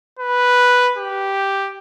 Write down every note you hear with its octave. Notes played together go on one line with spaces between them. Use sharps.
B4
G4